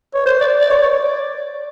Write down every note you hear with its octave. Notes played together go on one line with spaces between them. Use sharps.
C#5
C5
D5
D5
C#5
C#5
C#5
D5